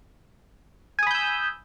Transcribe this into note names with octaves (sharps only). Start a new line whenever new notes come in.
G#5 B5 D#6 E6 G6